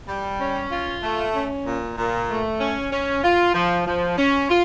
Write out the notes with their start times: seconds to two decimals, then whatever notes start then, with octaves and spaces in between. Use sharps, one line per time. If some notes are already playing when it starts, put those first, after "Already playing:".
0.08 G3
0.40 C#4
0.71 F4
1.03 A3
1.35 C#4
1.66 A#2
1.97 A#2
2.29 A3
2.60 C#4
2.92 C#4
3.23 F4
3.54 F3
3.86 F3
4.18 C#4
4.49 F4